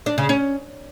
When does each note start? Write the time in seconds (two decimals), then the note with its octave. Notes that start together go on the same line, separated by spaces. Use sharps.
0.06 D4
0.18 C#3
0.29 C#4